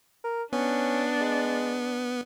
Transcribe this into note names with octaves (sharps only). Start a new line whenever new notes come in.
A#4
B3 C#4 D4
G#3